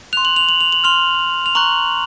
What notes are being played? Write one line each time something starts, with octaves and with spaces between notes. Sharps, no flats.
C6 F#6 F7
F#7
F7
F#7
F7
F#7
C6 F6 F7
F7
A#5 C#6 F#6 F#7